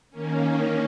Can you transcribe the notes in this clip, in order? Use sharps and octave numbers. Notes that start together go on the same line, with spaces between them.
D#3 A#3 C#4